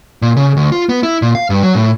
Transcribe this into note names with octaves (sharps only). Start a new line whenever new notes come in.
A#2
C#3
D2
F4
B3
E4
A#2
F5
G2
F#3
A2